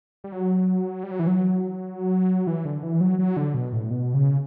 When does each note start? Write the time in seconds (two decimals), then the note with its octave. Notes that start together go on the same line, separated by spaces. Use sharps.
0.24 G3
0.32 F#3
1.03 G3
1.11 F#3
1.19 E3
1.27 F#3
2.47 E3
2.65 D3
2.83 E3
3.01 F#3
3.19 F#3
3.37 D3
3.54 B2
3.72 A2
3.90 B2
4.14 C#3